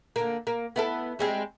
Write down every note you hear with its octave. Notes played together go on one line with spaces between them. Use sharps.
D3 A#3
A#3
B3 E4 A4
G3 G#3 C4